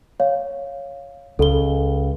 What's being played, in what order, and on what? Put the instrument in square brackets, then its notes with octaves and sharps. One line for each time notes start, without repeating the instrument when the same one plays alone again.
[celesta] C#5 F5
[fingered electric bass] C#2 [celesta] A4 G7